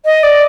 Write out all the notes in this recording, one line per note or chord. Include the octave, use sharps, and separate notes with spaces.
D#5
D5